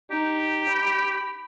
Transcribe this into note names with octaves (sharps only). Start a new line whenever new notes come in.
D#4 G4
B5